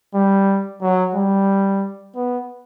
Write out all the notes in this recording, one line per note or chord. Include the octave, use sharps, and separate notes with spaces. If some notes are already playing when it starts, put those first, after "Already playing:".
G3
F#3
G3
B3